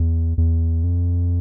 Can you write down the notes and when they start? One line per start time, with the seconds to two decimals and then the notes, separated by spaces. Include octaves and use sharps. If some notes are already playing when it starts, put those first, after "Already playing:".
Already playing: E2
0.38 E2
0.84 F2